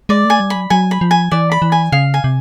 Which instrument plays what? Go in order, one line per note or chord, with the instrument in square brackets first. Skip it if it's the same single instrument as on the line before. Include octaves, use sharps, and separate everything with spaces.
[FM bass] G#3 [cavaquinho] D5
[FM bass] A3
[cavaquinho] G#5
[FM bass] G3
[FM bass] F#3 [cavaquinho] B5
[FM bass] F#3 [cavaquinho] G#5
[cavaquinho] B5
[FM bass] F3
[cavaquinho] G#5
[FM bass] E3 [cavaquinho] D5
[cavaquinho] B5
[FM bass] E3
[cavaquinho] G#5
[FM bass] C#3 [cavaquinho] F5
[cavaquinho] G#5
[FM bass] C3